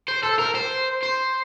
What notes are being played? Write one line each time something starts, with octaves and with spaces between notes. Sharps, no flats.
C5
A4
A#4
C5
C5